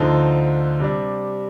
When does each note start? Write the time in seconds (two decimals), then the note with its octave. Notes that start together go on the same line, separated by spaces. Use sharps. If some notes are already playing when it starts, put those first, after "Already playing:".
Already playing: D2 D3 F3 C4 D#4
0.79 C3 G3 D4